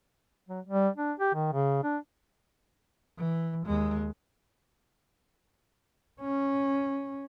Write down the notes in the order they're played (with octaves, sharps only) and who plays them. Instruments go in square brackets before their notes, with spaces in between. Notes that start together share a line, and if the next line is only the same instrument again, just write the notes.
[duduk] F#3
G3
D4
G4
D#3
C#3
D4
[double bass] E3
D#2 G#3
C#4